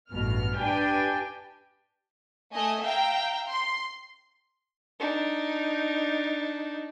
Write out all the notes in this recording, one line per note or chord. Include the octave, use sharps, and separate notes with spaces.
A1 G2 B2 F6
D4 G4 B4 G5 G#5
A3 D#5 G#5
E5 F5 G5 A#5
C6
D4 D#4